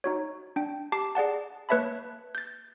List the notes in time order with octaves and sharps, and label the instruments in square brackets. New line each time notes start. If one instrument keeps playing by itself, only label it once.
[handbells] D#4 F#4 C#5
D4 G5
G4 A5 D6 C7
G#4 D5 F#5 A5
A#3 B4 C#5 E5 A5 B5
G6 A6